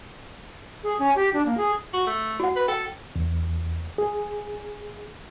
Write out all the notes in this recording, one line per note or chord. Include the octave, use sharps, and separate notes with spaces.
G#4
C#4
G4
D4
A#3
G#4
F#4
A3
F#4 F#5
B4
A4 G5
E2
G#4